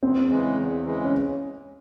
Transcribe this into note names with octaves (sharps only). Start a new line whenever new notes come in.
E2 C4
C#3 E3 G#3
E2
C#3 E3 G#3
C#4